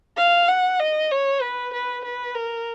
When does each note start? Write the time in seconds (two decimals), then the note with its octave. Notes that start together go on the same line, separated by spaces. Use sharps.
0.17 F5
0.48 F#5
0.79 D#5
1.11 C#5
1.41 B4
1.73 B4
2.04 B4
2.35 A#4